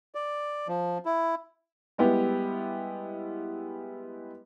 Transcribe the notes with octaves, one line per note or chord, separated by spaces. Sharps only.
D5
F3
E4
G3 G#3 B3 E4 G4